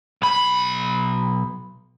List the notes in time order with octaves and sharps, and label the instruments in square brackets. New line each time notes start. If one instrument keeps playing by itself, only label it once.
[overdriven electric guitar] B1 B5